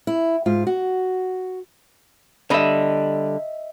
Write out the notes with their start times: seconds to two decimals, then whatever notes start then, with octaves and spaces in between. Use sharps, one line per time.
0.07 E4
0.46 G#2 F4
0.67 F#4
2.50 D3 G3 D#5 E5 B5